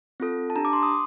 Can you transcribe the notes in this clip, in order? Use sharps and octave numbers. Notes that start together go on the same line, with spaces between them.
C4 F4 A4
A5
D4 G4 A#5
D6
C6
D#6